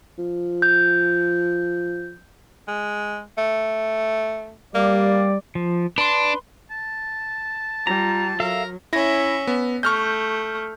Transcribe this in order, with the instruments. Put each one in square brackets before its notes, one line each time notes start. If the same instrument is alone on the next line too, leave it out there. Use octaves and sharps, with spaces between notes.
[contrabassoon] F3
[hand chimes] G6
[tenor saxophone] G#3
A3
[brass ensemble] G3 D5 [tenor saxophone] A#3
[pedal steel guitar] F3
[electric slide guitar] D4 [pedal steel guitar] B4 C6
[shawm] A5
[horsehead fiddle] G3 F4 [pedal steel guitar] A#5
[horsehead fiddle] F#3 [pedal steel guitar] A4 E5 F5 [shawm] A#4
[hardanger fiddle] C#4 E5 [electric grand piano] E4 A#6
[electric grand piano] B3
[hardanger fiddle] A3 [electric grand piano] C#6 F6 G6